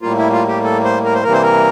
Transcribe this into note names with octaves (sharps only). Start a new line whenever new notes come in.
A2 G3 A#3 F4
E4
F4
G4
A4
C5
A#4
C5
C3 E3 G3 A#3 A#4
C5
A#4